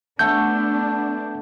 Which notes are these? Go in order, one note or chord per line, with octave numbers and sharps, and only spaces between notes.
A3 B3 D4 F#5 A5 G6